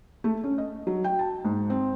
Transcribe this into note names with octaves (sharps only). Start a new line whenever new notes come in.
A3
C#4
D#5
F#3
G5
A5
G#2
C4